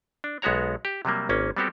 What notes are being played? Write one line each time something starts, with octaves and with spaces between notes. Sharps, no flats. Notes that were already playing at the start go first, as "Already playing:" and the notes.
D4
B1 G#3 B3 F#4 C#5 A#5
G4
C3 F#3 G3 A#3
G#1 A#3 C#4
G3 B3 C4 F#4 G4 A4